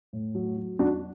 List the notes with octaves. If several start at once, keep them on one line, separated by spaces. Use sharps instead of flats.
A2
F#3
F#3
F#3 D4 F#4